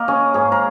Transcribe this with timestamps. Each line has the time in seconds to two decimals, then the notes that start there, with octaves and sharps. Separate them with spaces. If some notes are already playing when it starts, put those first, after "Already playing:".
Already playing: A#3 A#4 D#5
0.08 C#4 G#4
0.34 G#2 G#4
0.52 A#4